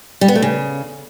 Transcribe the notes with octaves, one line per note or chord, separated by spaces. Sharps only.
G3
B3
A3
C#3